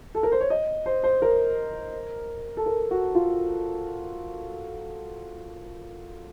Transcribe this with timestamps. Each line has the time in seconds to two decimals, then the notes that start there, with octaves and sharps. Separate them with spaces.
0.15 A4
0.23 A#4
0.32 C5
0.41 C#5
0.50 D#5
0.86 C5
1.04 C5
1.22 A#4
2.57 A4
2.66 A#4
2.91 F#4
3.15 F4